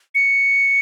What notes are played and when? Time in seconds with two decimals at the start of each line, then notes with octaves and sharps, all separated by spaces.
0.15 C#7